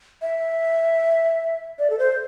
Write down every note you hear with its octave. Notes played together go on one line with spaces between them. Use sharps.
E5
D5
A4
C5